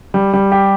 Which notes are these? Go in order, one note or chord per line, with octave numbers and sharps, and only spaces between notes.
G3
G3
G4